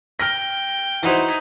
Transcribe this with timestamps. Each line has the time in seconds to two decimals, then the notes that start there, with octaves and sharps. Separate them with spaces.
0.20 G5 F6 A#6
1.03 E3 D#4 E4 F#4 C5